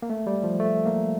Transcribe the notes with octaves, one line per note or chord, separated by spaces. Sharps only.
A#3
A3
G3
F3
A3
A#3